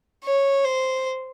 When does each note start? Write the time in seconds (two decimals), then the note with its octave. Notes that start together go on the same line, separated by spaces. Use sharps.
0.23 C#5
0.64 C5